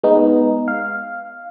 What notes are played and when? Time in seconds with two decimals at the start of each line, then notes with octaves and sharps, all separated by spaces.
0.03 G#3 B3 D#4
0.68 F5